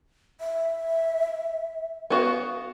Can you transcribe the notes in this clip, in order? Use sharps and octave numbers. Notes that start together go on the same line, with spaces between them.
E5
B3 F#4 F5